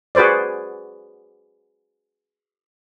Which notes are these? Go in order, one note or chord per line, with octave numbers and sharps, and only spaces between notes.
F#4 G#4 B4 C5 D5